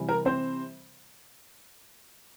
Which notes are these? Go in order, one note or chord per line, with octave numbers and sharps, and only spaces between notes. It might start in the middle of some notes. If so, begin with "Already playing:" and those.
Already playing: C3 E3 G3
A#4
C4 C5